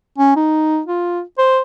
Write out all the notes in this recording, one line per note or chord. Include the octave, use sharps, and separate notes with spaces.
C#4
D#4
F4
C5